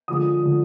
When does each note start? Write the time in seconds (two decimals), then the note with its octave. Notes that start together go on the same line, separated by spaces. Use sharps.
0.08 D3 F3 G#3 D#6
0.42 D3 F3 G#3